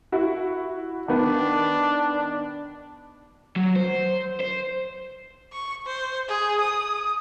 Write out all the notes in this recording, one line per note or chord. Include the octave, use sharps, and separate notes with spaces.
E4 F#4
D#3 B3 D4
F#3
C5
C5
C#6
C5
G#4
D#6